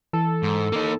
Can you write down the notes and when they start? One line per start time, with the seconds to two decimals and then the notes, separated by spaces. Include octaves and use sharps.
0.13 E3 A4
0.43 G#2
0.72 A#3 D#4